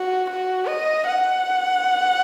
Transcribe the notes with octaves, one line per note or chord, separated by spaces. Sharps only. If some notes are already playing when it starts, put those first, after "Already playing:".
Already playing: F#4
F#4
D#5
F#5